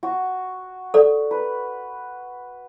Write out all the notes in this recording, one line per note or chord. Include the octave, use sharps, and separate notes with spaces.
F#4
A4 D5
B4